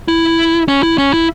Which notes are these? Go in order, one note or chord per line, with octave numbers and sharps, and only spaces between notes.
E4
C#4
E4
C#4
E4